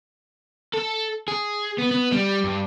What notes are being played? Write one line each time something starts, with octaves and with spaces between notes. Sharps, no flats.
A4
G#4
B3
B3
G3
G2